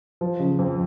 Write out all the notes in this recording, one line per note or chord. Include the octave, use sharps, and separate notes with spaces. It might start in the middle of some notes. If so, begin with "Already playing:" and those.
F3
C#3
F2